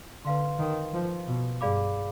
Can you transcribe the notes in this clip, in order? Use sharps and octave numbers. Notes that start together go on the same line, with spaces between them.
D3 B4 F5 C6
D#3
F3
B2
G2 G#4 D5 F5 B5 D6